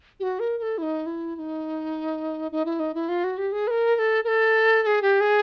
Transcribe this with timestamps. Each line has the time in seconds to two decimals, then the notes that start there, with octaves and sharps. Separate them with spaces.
0.20 G4
0.23 F#4
0.40 A#4
0.58 A#4
0.62 A4
0.78 E4
0.82 D#4
1.06 E4
1.36 E4
1.39 D#4
2.52 D#4
2.65 E4
2.80 D#4
2.95 E4
3.09 F4
3.24 F#4
3.38 G4
3.52 G#4
3.67 B4
3.71 A#4
3.96 A#4
3.99 A4
4.24 A#4
4.28 A4
4.83 A4
4.86 G#4
5.02 G4
5.21 G#4